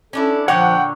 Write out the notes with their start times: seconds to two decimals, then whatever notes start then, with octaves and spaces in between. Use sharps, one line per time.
0.13 C#4 D4 E4 A4
0.48 A#2 D3 F3 C#5 F#5 G5